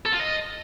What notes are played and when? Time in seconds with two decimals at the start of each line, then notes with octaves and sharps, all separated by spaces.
0.06 A4
0.13 F4
0.20 D#5